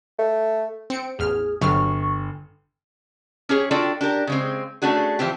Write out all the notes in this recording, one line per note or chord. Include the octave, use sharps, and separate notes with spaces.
A3
C4 C#7 D7
A1 E2 G#4 F6
G1 C3 F#3 C#6 F6
C#4 G4 G#4 C#5
D4 F4 F#4 A4 D5 G5
D4 G4 A#4
C#3 G#3 C4
A3 C#4 D4 F#4 G#4
E3 F3 C4 G4